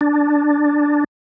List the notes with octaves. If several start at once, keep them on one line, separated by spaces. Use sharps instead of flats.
D4